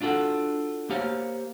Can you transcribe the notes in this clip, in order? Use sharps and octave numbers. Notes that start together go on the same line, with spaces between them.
D4 F4 F#4 A4
A#3 G4 C5 C#5 F5